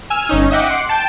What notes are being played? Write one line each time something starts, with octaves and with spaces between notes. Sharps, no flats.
G#5 E6 F6
G1 C#4 D#4
D#5 E5 F#5 G5 D6
F#5 C6 D6
G5 A5